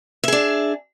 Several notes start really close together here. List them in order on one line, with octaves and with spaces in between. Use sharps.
E5 G#4 D4